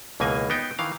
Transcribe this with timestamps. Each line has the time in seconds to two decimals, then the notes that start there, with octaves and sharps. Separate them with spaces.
0.20 C#2 B2 E3 A#3 G#5
0.50 B3 D#4 G5
0.79 D#3 E3 F5